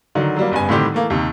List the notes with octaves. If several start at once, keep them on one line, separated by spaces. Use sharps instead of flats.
D3 D#3 F#3
F#3 G3 A#3
F#1 G2 B3 G#5
A2 D3 D#3 G3 C4 G4
E3 A3 A#3
D#2 C3 D#3